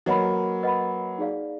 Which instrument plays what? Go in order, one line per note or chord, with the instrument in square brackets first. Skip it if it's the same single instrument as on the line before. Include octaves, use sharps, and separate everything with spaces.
[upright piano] F#3 A#3 [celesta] B4 D#5 F#5 B5
[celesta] B4 D#5 F#5 B5
D#4 G#4 D5 F5